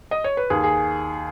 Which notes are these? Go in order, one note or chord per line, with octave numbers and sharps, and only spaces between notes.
D#5
C#5
B4
D#2 G#4
G#4